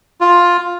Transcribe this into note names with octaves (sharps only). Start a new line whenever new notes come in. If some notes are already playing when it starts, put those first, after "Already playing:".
F4